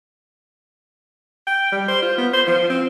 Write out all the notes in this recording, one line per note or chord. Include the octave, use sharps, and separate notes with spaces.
G5
G3
C5
F4
B3
C5
F3
C4